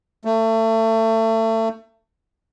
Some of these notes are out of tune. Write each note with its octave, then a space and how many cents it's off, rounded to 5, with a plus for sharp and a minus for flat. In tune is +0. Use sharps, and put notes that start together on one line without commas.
A3 +30